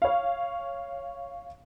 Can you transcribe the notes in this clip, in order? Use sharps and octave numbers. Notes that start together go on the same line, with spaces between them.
C#5 F5